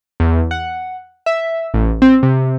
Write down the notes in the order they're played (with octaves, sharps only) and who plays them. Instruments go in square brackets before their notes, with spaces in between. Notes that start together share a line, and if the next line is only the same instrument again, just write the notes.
[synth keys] E2
F#5
E5
A1
C4
C3